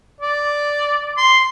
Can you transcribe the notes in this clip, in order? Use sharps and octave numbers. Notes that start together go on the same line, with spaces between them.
D5
C6